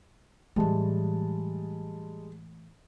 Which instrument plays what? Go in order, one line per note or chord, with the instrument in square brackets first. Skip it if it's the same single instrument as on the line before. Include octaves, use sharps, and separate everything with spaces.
[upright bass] A2 E3 [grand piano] G3 G#3 A5